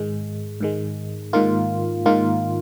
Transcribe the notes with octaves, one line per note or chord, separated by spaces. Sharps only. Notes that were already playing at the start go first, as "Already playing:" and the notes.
Already playing: G#2 D#3 G#3
G#2 D#3 G#3
G#2 D#3 A#3 F4
G#2 D#3 A#3 F4